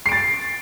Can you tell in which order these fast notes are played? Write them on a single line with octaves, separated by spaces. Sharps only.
C7 D7 A6